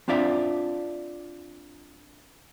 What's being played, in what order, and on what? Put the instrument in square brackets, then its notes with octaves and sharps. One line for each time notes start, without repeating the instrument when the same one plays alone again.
[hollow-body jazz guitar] C4 D4 F4 D5 E5